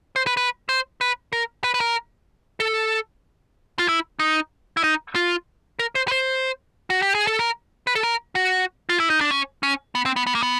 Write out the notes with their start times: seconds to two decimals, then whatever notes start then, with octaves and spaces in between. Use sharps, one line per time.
0.16 C5
0.27 B4
0.37 B4
0.69 C5
1.01 B4
1.33 A#4
1.64 B4
1.74 B4
1.80 A#4
2.60 A4
3.79 F4
3.89 E4
4.19 D#4
4.77 E4
4.84 D#4
5.15 F4
5.79 A#4
5.95 C5
6.08 B4
6.12 C5
6.90 F#4
7.02 G4
7.15 G#4
7.27 A4
7.39 A#4
7.87 B4
7.95 A4
8.03 A#4
8.35 F#4
8.89 F4
9.00 E4
9.10 D#4
9.21 D4
9.31 C#4
9.63 C#4
9.95 B3
10.06 C4
10.16 B3
10.27 B3
10.35 A#3
10.43 B3